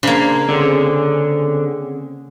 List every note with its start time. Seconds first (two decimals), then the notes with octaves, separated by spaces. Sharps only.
0.03 C#3 A#3 D4 C5 G#6
0.49 D3 C4 C#4 G#4